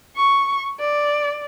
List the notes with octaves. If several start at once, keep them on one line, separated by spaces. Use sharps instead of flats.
C#6
D5